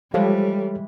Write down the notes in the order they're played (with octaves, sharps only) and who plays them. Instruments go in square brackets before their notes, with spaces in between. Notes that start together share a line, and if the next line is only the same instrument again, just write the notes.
[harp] E3 G#3 [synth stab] F3 [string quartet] G3 [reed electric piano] G4 A4 C#5